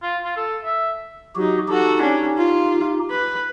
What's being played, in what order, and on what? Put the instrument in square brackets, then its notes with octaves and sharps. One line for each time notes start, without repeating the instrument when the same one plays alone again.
[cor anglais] F4
F4
A4
E5
[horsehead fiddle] F#3 D#4 [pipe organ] F#4 G4
[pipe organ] D#4 G4 [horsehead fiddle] F#4 A4
[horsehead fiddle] C#4 D4
F4
B4